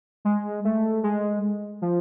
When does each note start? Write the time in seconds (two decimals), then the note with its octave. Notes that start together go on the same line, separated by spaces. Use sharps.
0.25 G#3
0.65 A3
1.03 G#3
1.82 F3